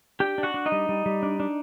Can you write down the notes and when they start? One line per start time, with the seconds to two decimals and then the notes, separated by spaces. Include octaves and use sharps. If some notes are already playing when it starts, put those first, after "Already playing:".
0.20 D4 G4 G5
0.38 D4
0.43 F#4 F#5
0.54 D4
0.66 D#4 D#5
0.72 G3
0.89 G3
1.06 G3
1.23 D4
1.40 D4